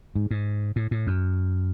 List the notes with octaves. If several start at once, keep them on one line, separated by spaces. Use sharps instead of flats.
G#2
G#2
A2
A2
F#2